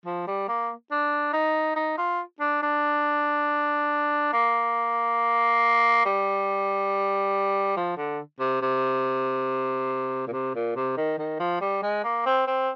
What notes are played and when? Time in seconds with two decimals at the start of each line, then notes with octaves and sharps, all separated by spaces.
0.06 F3
0.27 G3
0.49 A#3
0.92 D4
1.34 D#4
1.76 D#4
1.98 F4
2.40 D4
2.63 D4
4.33 A#3
6.06 G3
7.77 F3
7.97 D3
8.40 C3
8.62 C3
10.27 A#2
10.33 C3
10.55 A#2
10.76 C3
10.97 D#3
11.19 D#3
11.40 F3
11.61 G3
11.83 G#3
12.04 A#3
12.26 C4
12.47 C4